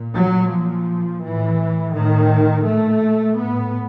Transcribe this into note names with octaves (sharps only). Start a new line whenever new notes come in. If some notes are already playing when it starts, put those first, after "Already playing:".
Already playing: A#2
F#3
A#2 F3
A2 E3
A2 D#3
A#2 A3
A2 B3